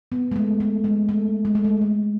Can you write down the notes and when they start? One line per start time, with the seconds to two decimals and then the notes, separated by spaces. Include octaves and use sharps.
0.12 B3
0.32 G#3
0.36 A3
0.60 A3
0.84 G#3
1.09 A3
1.45 G#3
1.55 A3
1.65 G#3
1.81 A3